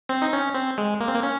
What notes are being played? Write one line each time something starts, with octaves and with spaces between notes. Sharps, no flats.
C4
D#4
C#4
C4
G#3
A#3
C4
A#3
C#4